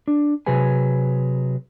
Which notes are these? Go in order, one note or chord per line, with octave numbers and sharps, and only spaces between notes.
D4
C3 F#3 G#4 B4 G#5